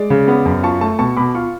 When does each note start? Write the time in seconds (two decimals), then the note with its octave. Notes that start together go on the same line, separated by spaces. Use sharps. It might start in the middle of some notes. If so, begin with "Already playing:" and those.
Already playing: G#3 D5
0.10 C#3
0.28 B3
0.46 F#2
0.63 F4 A5 C#6
0.81 A3 A5 C#6
0.99 B2 A5 C#6
1.17 B2 B5 D6
1.34 F4 C#6 F6